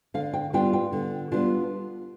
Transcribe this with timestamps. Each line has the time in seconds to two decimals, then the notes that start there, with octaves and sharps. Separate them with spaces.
0.14 D3 F5
0.34 G5
0.53 G3 B3 D4 F4 G5
0.73 G5
0.92 D3
1.32 G3 B3 D4 F4